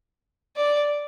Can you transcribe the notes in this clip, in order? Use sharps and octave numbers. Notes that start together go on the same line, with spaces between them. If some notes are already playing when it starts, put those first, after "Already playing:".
D5